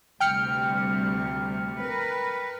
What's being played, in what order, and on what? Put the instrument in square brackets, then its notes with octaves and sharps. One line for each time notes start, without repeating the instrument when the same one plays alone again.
[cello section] D2 C3 G3 [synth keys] G5 F6 C#7
[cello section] A#4 B4